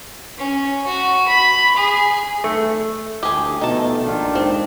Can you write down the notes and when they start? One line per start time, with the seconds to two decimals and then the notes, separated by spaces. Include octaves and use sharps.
0.38 C#4
0.87 F#4
1.28 B5
1.77 G#4
2.44 A3
3.23 D2 A2 A3 G4 G#4
3.61 B2 F3 A3 D#4 A5
4.04 A#1 D#3 D4 F4
4.35 G#2 C4